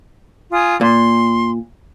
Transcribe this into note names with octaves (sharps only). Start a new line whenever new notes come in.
F4 G#5 D#6
A#2 C6